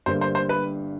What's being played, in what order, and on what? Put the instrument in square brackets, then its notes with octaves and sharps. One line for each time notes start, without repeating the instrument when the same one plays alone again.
[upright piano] G1 G2 D3 G3 A#3 [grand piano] C5
[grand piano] C5
C5
B4